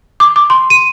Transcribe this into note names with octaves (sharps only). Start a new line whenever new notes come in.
D6
D6
C6
D#7